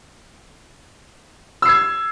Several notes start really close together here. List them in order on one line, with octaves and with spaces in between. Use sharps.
E6 C7 G#6